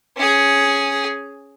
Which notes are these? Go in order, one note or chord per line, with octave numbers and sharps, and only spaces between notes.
C#4 G#4